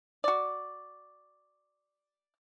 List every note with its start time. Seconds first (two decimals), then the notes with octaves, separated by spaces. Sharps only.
0.24 F#4 D5